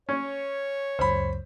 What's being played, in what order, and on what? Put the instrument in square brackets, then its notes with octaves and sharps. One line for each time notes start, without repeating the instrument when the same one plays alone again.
[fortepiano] C#4 [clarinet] C#5
[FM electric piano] C#2 F#2 [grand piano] C5 B5